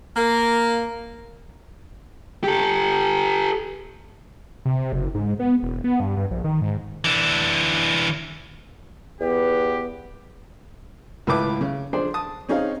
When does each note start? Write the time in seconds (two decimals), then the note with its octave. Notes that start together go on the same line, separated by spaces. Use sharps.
0.16 A#3
2.43 G4 A4
4.65 C3
4.93 F#1
5.15 G#2
5.39 B3
5.63 E1
5.84 B3
6.00 G2
6.17 G2
6.31 A#1
6.44 D#3
6.61 G#2
7.05 E3 D4
9.20 E2 B3 G4
11.27 C#2 A2 B4 E5 A5 D6
11.61 C#3
11.93 F3 D4 G#4 C5 D5
12.14 A5 D#6
12.49 C4 C#4 D#4 G#4 F5